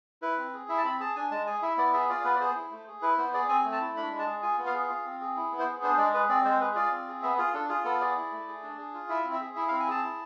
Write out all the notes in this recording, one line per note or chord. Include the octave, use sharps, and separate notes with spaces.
E4 B4
C4
G#4
E4 E5
A5
C4 B5
G#4 A5
D4 G#5
G#3 A5
G#4 G#5
E4 E5
B3 D5
G#4 E5
F4 D5
B3 B4
D5
G#4 C5
E4
A3
G#4
E4 B4
B3 C5
G#4 D5
C4 G#5
A3
A5
E4
D4 B5
G#3
A5
G#4
F4 G#5
B3
F5
G#4
F4
C4
G#4
E4
B3
C5
G#4
D4 C5
G#3 D5
G#4 B4
C4 D5
G#3 C5
G#4 B4
F4 D5
C4
G#4
B3 E5
F4 G#4
D4 A4
F4 G#4
B3 A4
G#4 D5
E4
A3
G#4
D4
G#4
F4
E4 E5
C4
E5
G#4
E4 E5
C4 F5
G#5
G#4 A5
E4